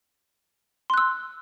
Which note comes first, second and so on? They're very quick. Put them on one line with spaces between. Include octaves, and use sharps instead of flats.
C6 F#6 E6